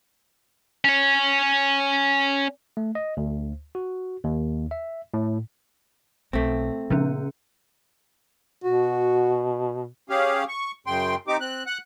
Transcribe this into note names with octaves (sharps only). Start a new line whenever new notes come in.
C#4 C#5
A3
D#5
D2
F#4
D#2
E5
A2
B1 A3 C4
A#2 C#3 F3 B3 C#4
B2 F#4
C#4 G4 G#4 F5
C#6
F#2 C#3 G5 C6
C4 D#4 G4 D6
C4 F#6
F#5 F#6